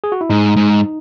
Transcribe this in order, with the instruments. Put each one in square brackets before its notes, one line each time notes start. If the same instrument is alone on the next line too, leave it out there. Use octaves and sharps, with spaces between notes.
[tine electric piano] G#4
F#4
E4
[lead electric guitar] G#2 [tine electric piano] D#4
[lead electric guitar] G#2